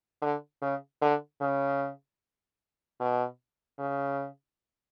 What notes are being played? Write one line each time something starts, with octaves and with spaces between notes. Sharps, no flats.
D3
C#3
D3
C#3
B2
C#3